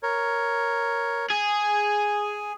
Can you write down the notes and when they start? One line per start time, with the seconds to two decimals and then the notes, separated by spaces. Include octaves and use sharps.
0.03 A#4 C#5
1.30 G#4 G#5